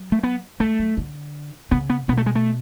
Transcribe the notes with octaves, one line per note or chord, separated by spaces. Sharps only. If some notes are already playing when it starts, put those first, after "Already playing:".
Already playing: F#3
A3
B3
G#3 A3
F#3
D3
C#3 B3
B3
B2 B3
A3
G#3
A3